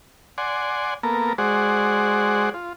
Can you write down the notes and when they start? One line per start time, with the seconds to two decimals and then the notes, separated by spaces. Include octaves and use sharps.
0.38 D5 F#5 G#5 C6
1.03 A#3 B3 A4 A#4
1.38 G#3 F#4 G#4 C5 D5 F#5
2.54 F4